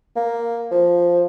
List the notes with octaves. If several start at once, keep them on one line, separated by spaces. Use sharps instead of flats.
A#3
F3